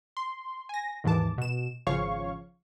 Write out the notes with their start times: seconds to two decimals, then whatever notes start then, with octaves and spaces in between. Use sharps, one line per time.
0.17 C6
0.69 G#5 A#6
1.04 D#2 G#2 E3 A5 D6
1.38 B2 E7
1.87 G#1 C#3 F3 C#5 F5 C#6